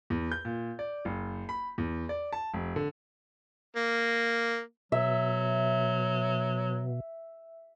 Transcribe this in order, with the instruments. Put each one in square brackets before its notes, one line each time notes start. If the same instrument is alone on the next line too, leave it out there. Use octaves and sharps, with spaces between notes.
[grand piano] E2
G6
A#2
D5
F#1
B5
E2
D5
A5
F1
D3
[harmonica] A#3
[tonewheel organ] B2 [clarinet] F#3 [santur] E5